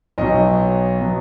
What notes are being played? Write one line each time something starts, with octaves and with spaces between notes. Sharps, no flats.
B1 B2 F#3 D#5
B2 F#3